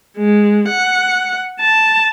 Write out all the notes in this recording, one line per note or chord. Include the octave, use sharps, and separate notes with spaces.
G#3
F#5
A5